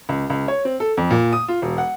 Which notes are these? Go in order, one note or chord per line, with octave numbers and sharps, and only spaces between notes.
C#2
C#2
C#5
C4
A4
F2
A#2
D#6
F4
E1
F#5